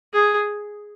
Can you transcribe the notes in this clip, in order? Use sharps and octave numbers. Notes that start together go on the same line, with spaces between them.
G#4